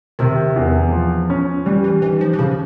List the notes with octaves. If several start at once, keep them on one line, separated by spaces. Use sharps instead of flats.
C3 D#3
E2
F3
C#4
E3 G3
E3
D#3 E3
F3
E3
C#3 F3